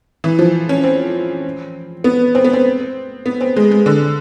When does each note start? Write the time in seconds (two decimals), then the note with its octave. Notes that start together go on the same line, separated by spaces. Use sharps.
0.24 E3
0.39 F3
0.69 C#4
0.84 C4
2.04 B3
2.35 C4
2.44 B3
2.53 C4
3.26 B3
3.41 C4
3.56 G#3
3.71 G#3
3.86 D3